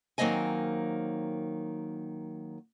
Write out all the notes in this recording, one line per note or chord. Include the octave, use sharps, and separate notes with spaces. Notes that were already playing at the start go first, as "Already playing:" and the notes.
D#3 F#3 A#3 C4 D#5 G#5